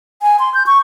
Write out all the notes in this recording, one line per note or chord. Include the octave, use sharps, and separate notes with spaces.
G#5
C6
G6
C#6